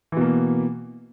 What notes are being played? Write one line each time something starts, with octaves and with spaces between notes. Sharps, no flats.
B2 E3 A#3